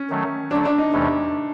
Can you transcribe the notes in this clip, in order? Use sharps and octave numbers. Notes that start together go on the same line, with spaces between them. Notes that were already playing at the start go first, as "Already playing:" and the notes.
Already playing: C#4
D#3 F#3 A3
D3 F#3 A3 D4
D4
D#4
E2 C3 E3 A3 C#4